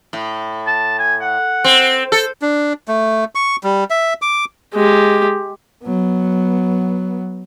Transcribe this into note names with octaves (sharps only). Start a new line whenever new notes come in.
A2
A5
G#5
F#5
C4
A4 C5
D4
A3
C#6
G3
E5
D6
G#3 G4
F#3 B3